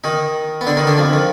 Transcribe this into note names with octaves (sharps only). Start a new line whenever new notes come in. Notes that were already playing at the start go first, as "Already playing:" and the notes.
D#3 D#4
B3
D3 D4
D#3 D#4
D3 D4
F2 F3
D#3